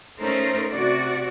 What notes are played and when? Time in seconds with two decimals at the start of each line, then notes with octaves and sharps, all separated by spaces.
0.20 A3 C#4 D#4 A#4 C5
0.71 C3 F#4 D5